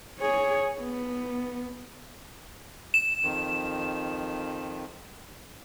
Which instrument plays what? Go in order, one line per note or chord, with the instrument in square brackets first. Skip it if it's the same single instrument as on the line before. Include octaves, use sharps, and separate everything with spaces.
[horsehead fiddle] G#4 C#5
B3
[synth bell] E7
[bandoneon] F2 D#3